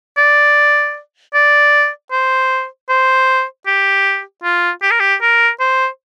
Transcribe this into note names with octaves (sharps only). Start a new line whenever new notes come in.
D5
D5
C5
C5
G4
F4
G4
A#4
G4
A#4
C5